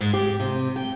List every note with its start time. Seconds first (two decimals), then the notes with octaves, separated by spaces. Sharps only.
0.01 G#2
0.14 G4
0.40 C3
0.76 G5